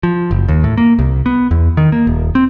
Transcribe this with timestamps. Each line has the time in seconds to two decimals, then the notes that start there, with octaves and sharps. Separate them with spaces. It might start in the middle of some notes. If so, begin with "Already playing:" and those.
0.03 F3
0.31 F#1
0.48 D#2
0.64 A2
0.77 A#3
0.99 C2
1.26 B3
1.51 E2
1.77 D#3
1.92 A#3
2.07 D#1
2.35 C4